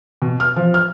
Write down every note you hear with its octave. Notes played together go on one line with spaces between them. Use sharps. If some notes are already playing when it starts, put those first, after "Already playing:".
B2
F6
F3
F6